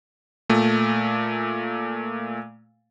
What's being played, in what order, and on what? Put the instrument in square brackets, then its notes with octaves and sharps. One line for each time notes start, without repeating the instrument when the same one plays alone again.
[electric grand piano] A#2 A3